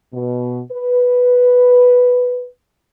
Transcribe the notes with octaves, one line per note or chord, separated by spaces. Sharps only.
B2
B4